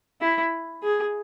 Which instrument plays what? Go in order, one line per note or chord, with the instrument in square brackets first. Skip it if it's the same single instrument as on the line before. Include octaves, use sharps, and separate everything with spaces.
[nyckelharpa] E4
G#4